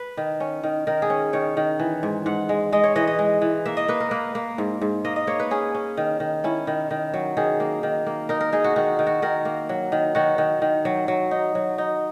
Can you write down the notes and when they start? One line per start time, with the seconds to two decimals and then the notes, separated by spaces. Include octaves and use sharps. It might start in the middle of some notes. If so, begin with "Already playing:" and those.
Already playing: B4
0.17 D#3
0.40 C#4
0.63 D#3
0.87 D#3 A#4
1.02 G#4
1.10 C#4
1.33 D#3 C#5
1.57 D#3
1.79 E3
2.03 G#2
2.26 G#2 F#5
2.49 G#3
2.73 G#3 D#5
2.84 C#5
2.96 E3 D#5
3.07 D#5
3.19 G#3
3.42 E3
3.66 A#3 E5
3.77 D#5
3.88 A#3 B4
4.00 A#4
4.11 A#3 B4
4.35 A#3
4.58 G#2
4.81 G#2
5.05 A#3 D#5
5.16 D#5
5.27 A#3 C#5
5.40 B4
5.51 C#4 G#4
5.75 C#4
5.97 D#3
6.20 D#3
6.44 C#4 E4
6.67 D#3
6.91 D#3
7.14 F#3
7.37 D#3 G#4
7.60 A#3
7.83 D#3
8.06 A#3
8.29 D#4 A#4
8.41 A#4
8.52 D#4 G#4
8.64 F#4
8.76 D#3 F#4
8.99 D#3
9.07 F#4
9.22 D#3 A#4
9.45 A#3
9.69 F#3
9.92 D#3
10.15 D#3 F#4
10.38 D#3
10.62 D#3
10.85 F#3
11.08 F#3
11.31 D#4
11.55 F#3
11.78 D#4